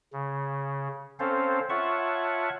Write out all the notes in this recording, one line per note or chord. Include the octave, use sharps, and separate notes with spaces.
C#3
C4 C#4 A4 C5 F5
F4 C#5 E5 F#5 A5 C#6